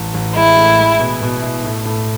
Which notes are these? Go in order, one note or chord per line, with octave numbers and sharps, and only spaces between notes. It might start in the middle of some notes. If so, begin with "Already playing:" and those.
Already playing: A1
A1
G#3 E4
A2
G#3
B2
B2
E4
A2
A2